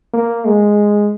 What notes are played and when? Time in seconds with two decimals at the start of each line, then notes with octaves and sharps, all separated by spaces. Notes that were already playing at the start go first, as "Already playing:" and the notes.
0.14 A#3
0.45 G#3